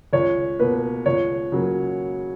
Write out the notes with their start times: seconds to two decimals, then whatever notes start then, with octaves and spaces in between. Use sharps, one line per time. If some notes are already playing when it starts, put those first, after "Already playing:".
0.13 C#2 C#5
0.59 B2 A#3 B4
1.06 C#2 C#5
1.52 C#3 F#3 A#3